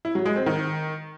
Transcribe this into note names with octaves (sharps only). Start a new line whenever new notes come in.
E4
F#3
G#3
C4
D#3